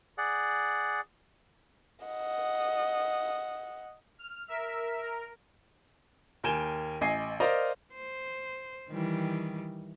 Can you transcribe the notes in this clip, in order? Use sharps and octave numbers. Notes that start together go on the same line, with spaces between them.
G#4 D5 F#5
D#5 F#5
F6
A#4 E5
A#4
D#2 A#4 G5 G#5 E7 G7
A1 D#5 G#5 C7
A#4 C5 D5 D#5 F5 A#5
C5
D#3 E3 G3